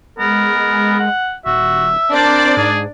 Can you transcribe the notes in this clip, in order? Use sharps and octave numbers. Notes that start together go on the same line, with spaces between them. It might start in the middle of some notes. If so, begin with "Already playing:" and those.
G#3 B3 A#4
F#5
D#1 F#4 E5
C4 D4 A#4 C5 D5
G#2 G#4